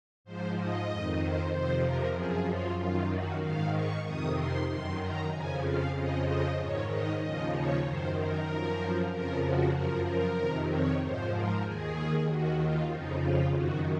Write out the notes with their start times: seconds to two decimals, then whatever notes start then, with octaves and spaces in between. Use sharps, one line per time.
0.24 G#2 F3 C5
0.57 D#5
0.89 F2 D#3
1.19 C5
1.52 F2 C3 F3 C5
1.84 A#4
2.15 F#2 F3 G#4
2.47 F4
2.78 F#2 D#3 F4
3.10 F#4
3.41 G#2 D#3 F5
3.73 C#6
4.04 F2 C3 D#3 D#6
4.36 C6
4.68 F#2 D#3 C6
5.00 A#5
5.31 F2 C#3 F3 G#5
5.63 F5
5.94 F2 C#3 F3 D#5
6.26 D#5
6.58 G#2 D#3 C#5
6.89 D#5
7.21 D#2 C#3 F3 D#5
7.53 C#5
7.84 F#2 D#3 C5
8.17 A#4
8.48 F#2 F3
9.11 F2 C#3 F3 A#4
9.42 F#4
9.74 F#2 F3 A#4
10.06 A#4
10.37 F2 C3 D#3
10.69 C#5
11.01 G#2 F3 C5
11.32 A#4
11.64 D#2 D#3 G#4
12.28 D#2 D#3 F#4
12.59 F4
12.90 F2 C#3 F3 D#4
13.22 F4
13.54 F#2 D#3 F#4